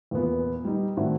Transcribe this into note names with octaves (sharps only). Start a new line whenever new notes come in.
E2 A#2 B3
G3 D#4
A2 D#3 C4 D4 E4 F#4